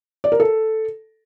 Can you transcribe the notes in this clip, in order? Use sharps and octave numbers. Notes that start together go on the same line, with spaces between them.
D5
A#4
A4